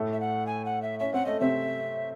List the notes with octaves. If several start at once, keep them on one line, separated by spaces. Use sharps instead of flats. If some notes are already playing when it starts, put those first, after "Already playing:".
Already playing: A2 A3
E5
F#5
G#5
F#5
E5
C#4 E5
C4 F#5
A3 D#5
C3 C4 E5